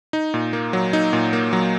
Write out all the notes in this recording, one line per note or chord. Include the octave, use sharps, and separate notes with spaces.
D#4
A#2
A#3
F#3
D#4
A#2
A#3
F#3